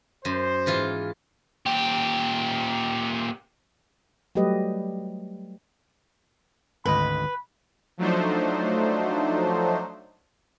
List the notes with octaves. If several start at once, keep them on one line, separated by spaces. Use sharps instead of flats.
F#2 C5
G#2 E3 F4
A#2 G4
F#3 G3 A3 G4 B4 D#5
G#1 D2 B4 D#5 B5
F3 F#3 A3 D4 D#4 C5